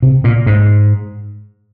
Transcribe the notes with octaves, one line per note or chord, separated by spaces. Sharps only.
C3
A#2
G#2